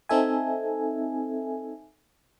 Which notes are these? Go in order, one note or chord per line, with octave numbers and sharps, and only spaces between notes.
C4 D#4 A4 E5 G#5